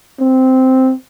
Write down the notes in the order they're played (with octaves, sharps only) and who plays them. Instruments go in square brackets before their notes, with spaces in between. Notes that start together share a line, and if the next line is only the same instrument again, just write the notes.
[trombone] C4